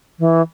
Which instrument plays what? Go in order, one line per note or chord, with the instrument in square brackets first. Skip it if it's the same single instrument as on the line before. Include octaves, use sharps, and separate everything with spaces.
[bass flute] E3